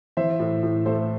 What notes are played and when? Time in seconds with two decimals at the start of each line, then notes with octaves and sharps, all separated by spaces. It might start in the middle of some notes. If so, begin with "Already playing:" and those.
0.17 E3 C5 E5
0.39 A2
0.63 A2
0.85 A3 A4 C5